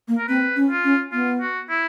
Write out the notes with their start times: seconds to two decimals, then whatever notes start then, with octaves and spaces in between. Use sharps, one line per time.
0.08 A#3
0.18 A#4
0.28 C4 B4
0.56 C#4
0.70 F4
0.84 C#4
1.12 B3 F4
1.41 F#4
1.69 E4